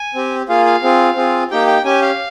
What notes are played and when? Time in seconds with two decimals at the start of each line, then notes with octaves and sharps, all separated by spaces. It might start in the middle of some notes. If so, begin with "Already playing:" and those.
Already playing: G#5
0.15 C4 G4
0.49 A#3 F4 G#4 F5
0.66 F5
0.83 C4 F4 G#4
1.16 C4 F4 G#4
1.51 A#3 D#4 G4 G5
1.67 G5
1.84 C#4 G4 G#5
2.02 F5